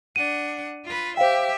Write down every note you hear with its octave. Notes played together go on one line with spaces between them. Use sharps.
D4 F#5 D#7
F4 B4
G4 C5 E5 F5 G5